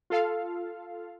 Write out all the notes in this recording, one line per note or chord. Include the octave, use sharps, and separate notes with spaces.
F4 A4 F5